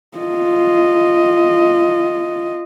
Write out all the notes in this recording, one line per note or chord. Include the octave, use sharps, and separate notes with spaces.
F4 D#5